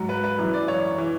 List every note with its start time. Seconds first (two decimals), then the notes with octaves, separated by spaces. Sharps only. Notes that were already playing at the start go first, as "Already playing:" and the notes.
Already playing: G#2 F#3
0.09 B4
0.24 B4
0.38 F#2 E3
0.54 D5
0.68 C#5
0.98 E3